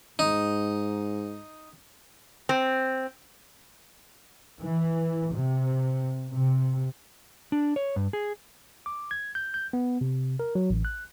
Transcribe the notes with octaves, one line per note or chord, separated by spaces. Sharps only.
G#2 D#4
C4
E3
C3
C3
D4
C#5
G2
G#4
D6
G#6
G6
G6
B3
C3
A#4
F#3
A1
F#6